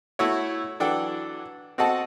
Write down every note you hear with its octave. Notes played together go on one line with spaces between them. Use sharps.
A3 E4 F#4 C#5
E3 F#3 D4 A4 F#5 G5
C4 F#4 A4 D#5 F#5 A5